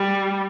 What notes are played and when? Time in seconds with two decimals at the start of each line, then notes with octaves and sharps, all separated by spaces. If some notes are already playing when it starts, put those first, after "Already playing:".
Already playing: G3